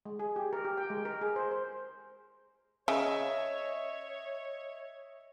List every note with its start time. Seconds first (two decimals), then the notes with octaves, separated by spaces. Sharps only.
0.05 G#3
0.19 G#4
0.36 G4
0.53 A#4
0.65 G4
0.77 G5
0.90 G#3
1.05 A#4
1.21 G#4
1.36 C5
1.51 C5
2.88 C#3 C#5 D#5 E5